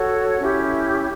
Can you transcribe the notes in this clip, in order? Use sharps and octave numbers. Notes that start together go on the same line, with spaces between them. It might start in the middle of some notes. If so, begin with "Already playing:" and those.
Already playing: F#4 A4 C#5
C#4 E4 G4